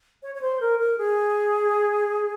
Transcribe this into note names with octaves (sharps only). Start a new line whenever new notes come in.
C#5
C#5
C5
A#4
A#4
G#4